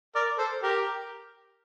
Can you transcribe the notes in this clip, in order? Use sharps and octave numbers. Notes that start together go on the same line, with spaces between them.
A#4 D5
A4 C5
G4 A#4